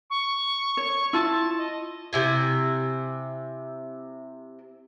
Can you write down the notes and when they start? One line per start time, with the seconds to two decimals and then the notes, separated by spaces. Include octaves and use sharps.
0.10 C#6
0.77 C#5
1.13 E4 F4 A5
1.58 D#5
2.13 C3 E4 G#5